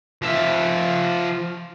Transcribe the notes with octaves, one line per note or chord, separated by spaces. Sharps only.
F3 E5